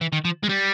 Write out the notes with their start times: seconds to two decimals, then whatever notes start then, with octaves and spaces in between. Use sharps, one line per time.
0.01 E3
0.13 D#3
0.25 F3
0.43 G#3
0.49 G3